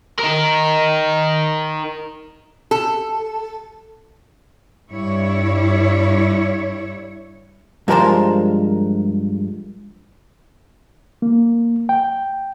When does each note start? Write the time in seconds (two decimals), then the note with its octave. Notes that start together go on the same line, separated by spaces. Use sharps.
0.19 D#4 A#4
2.71 A4
4.90 G2 E4 C#5
7.88 G2 F3 G#3 A#4 C5 A5
11.22 A#3
11.89 G5